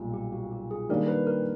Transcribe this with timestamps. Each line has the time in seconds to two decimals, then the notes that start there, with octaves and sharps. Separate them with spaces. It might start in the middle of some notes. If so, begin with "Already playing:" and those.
Already playing: B1 A#2 G3
0.14 G4
0.32 F#4
0.52 G4
0.71 G#4
0.89 D#3 G3 A#3 D4 A#4
1.08 B4
1.27 A#4